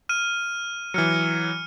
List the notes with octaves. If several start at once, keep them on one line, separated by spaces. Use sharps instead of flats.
F6 D#7
E3 F#3 F6 C#7